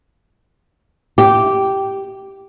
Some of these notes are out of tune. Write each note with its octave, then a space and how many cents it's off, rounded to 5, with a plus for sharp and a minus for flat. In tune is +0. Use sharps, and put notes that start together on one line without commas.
G4 -10